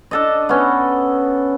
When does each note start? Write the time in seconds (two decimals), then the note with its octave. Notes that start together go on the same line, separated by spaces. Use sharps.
0.11 D4 A4 D#5
0.49 B3 C#4